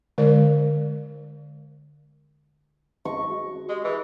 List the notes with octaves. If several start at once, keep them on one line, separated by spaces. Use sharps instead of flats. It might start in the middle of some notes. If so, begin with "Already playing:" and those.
D3 G#3 A#4 D5
D#5 C#6
F#4
G#3 G4
E3 E4